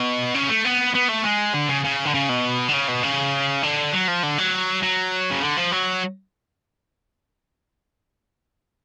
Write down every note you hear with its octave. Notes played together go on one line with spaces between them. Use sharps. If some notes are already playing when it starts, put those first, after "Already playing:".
Already playing: B2
C#3
A3
B3
B3
A3
G#3
D3
C#3
C#3
D3
C#3
B2
D3
C#3
B2
C#3
D3
F#3
F3
D3
F#3
F#3
C#3
D3
F3
F#3